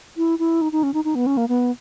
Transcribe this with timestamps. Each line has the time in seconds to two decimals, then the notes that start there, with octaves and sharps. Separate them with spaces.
0.17 E4
0.39 E4
0.61 D#4
0.72 D#4
0.83 C#4
0.94 D#4
1.05 D#4
1.15 B3
1.27 C#4
1.37 A#3
1.48 B3